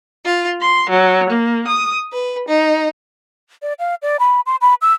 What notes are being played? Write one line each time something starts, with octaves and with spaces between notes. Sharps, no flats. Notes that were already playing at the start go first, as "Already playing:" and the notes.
F4
C6
F#3
A#3
D#6
B4
D#4
D5
F5
D5
B5
C6
B5
E6